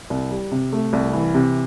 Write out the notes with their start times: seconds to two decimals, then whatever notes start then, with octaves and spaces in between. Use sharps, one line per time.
0.10 C2
0.31 G3
0.52 C3
0.73 A3
0.93 C2
1.13 E3
1.34 C3